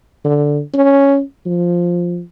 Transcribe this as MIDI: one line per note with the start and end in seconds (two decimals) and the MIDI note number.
0.25 0.61 50
0.74 1.21 61
1.46 2.21 53